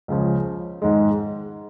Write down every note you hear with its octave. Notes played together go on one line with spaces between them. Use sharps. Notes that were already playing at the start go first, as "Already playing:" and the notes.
C#2 C#3 F3
G#2 D#3 G#3